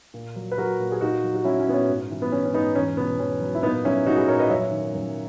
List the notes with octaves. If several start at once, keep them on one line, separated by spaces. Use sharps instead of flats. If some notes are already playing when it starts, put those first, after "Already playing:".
A#2
F#3
B4
F#3 F#4 A#4
A#2
G#4
A#2 D#4 F#4
F#3
F#4
F#3 C#4 E4
C#4
A#2 B3
C#4
G#2
E3
B3
E3 C#4
C#4
G#2 B3 D#4
E2 C#4
B2 B3
E2 C#4
F#3
E4
A#2 B3 D#4
F#3 C#4 E4
F#3 D#4 F#4
E4 G#4
A#2 A#4 C#5
B4 D#5
F#2 C#5 E5
D#3
F#2